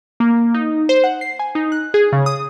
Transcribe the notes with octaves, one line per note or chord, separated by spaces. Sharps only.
A#3
D#4
C5
F#5
C7
G#5
D#4
F#6
G#4
C#3
D#6